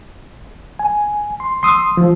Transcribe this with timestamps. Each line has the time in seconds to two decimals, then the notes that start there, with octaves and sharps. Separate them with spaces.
0.79 G#5
1.40 C6
1.63 C6 D#6 E6
1.97 F3